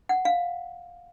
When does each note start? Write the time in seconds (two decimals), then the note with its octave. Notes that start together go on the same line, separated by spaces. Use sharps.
0.09 F#5
0.25 F5